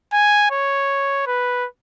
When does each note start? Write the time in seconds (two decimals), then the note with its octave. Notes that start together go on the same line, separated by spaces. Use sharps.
0.13 G#5
0.51 C#5
1.27 B4